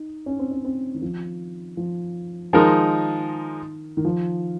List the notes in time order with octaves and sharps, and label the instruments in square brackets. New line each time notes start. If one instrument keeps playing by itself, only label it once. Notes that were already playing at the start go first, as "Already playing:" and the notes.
Already playing: [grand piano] D#4
C#4
C4
C#4
C4
D#3
F3
F3
[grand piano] D#3 [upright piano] F3 G#3 D#4 A#4
[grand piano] D#3
F3